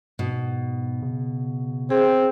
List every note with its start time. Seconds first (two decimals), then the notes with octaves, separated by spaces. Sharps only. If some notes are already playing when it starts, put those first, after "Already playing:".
0.19 G#2 B2
1.02 C#3
1.90 C4 G#4